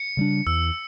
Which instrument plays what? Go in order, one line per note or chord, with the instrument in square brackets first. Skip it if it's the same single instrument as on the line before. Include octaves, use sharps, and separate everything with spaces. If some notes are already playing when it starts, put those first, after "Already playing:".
Already playing: [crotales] C#7
[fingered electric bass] C#3 G3 D4
[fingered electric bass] E2 [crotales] E6